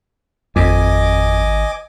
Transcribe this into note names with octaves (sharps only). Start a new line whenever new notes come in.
G#1 F2 D#5 G#5 D6